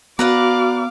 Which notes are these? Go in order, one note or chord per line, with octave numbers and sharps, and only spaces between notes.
B3 F#4 A#4 B4 D5 F5 D6